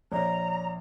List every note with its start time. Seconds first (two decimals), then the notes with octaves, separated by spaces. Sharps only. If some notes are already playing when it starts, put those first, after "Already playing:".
0.12 A#1 C#5 D5 A#5